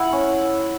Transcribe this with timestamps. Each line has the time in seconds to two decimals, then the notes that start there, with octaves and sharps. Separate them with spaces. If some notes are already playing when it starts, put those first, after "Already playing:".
Already playing: E4 F#5
0.12 C#4